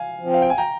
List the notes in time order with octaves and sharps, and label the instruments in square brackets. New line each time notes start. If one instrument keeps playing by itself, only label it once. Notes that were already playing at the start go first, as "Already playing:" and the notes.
Already playing: [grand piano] F5 G#5
[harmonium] F3
C4
[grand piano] F5
G5
G#5
G5 A#5